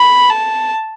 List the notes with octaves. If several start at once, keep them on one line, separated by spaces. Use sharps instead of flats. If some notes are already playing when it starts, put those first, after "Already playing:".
Already playing: B5
A5